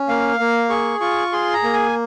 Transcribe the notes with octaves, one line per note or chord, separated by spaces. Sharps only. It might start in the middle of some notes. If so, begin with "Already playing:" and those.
Already playing: C#4
A#3 F5
A#3
G#4 C#6
F4 C#6
G#4 C6
A#5
A#3
G#5